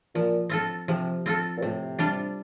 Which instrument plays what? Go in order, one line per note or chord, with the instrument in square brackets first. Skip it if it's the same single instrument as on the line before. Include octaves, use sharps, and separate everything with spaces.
[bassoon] A#2 [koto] F3
[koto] C4 F4 A4
[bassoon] C3 [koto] F3
[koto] C4 F4 A4
[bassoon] A#2
[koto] A2 [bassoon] C3
[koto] G3 D4 F4